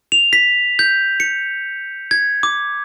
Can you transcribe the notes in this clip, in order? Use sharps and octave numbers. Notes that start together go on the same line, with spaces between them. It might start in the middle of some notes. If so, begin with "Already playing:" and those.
F7
B6
G6
C#7
G#6
D6